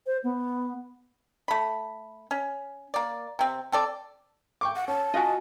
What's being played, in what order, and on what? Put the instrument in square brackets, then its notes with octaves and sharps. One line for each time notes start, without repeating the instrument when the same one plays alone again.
[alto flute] C5
B3
[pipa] A3 B5
C#4
A#3 D5
C3 C4
C4 A4 D5
[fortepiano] G5 C#6 D6
[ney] F#5
[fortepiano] C#4 [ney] A5
[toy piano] C#4 F5 G#5 [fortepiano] F4 [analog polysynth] F#4 D#5